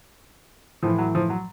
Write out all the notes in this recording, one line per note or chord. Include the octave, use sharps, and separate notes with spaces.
A2 E3 F3
F#3
F3
F#3